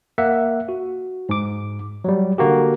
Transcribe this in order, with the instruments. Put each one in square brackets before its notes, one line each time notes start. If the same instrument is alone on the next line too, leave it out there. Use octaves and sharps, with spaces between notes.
[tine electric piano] A#3 E5 F#5
F#4
G#2 D6
F#3 G3
D3 A#3 F#4 G4